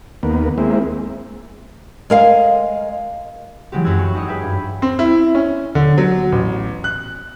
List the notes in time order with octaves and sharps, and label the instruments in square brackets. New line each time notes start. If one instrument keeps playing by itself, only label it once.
[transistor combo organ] D#2 A#3 B3
G#3 A#3 C4 E4
[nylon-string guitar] G#3 A#4 F5
[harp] E3 F#3 G#3 C4 G4
F#2 F#4 G#4 B4 E6 G#6
G#5 C#6 F#6
D#4 G4 C#5 D#5
G#4 B4 E5 G5 G#5
G2
[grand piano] C4
E4
C#4
D3
F#3
A1
F#6